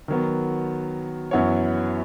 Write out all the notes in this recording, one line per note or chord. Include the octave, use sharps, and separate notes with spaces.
D#3 F#3 B3
F#2 E3 B3 F#4 C#5